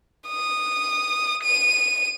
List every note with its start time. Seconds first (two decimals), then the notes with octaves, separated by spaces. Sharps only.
0.29 D#6
1.44 D#7